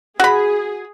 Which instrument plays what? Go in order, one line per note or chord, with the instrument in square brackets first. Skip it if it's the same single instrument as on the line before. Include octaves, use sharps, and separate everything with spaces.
[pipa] F#4 B5 [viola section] G#4